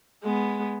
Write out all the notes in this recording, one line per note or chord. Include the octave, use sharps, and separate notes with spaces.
G#3 B3